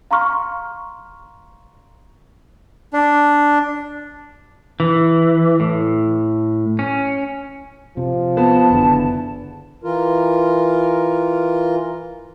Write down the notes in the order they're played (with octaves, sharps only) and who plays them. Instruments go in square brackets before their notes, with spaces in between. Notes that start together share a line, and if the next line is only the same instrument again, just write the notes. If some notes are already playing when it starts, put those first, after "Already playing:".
[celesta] F5 A#5 C6 C#6 F6
[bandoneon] D4
[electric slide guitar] E3
A2
C#4
[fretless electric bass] C3 [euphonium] F3
[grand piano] B3 [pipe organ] A5
[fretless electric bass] F#1 D3 [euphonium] E2
[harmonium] E3 F4 A#4